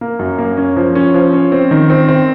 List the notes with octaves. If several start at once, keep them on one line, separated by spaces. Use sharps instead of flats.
A#3
F#2
A#3
C#4
F3
C#4
F3
C#4
C4
D#3
C4
C4